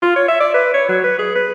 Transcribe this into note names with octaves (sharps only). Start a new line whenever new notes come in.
F4
C#5
E5
D5
B4
C#5
F#3
B4
G#4
B4